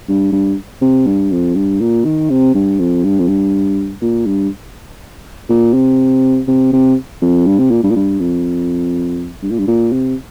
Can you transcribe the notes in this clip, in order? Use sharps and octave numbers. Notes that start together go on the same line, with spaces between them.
G2
G2
C3
G2
F2
G2
A#2
D#3
C3
G2
F2
G2
F2
G2
A#2
G2
A#2
C3
C3
C3
F2
G2
C3
A#2
G2
A#2
G2
F2
G2
A#2
G2
A#2
C3